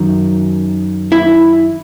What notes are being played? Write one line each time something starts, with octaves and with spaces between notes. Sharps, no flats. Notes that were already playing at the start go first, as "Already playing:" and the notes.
Already playing: F#2 D#3 F#3
E4